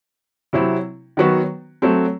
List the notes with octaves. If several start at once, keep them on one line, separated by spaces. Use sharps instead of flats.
C3 F#3 C4 E4
D#3 F#3 B3 F#4 B4
F#3 A3 C4